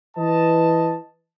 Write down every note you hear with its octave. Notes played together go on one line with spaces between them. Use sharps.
E3 B4 D#5 A5